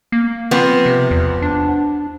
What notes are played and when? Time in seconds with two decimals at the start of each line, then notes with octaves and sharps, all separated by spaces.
0.12 A#3
0.51 F3 B3 C4
0.86 C3
1.11 E2
1.42 D4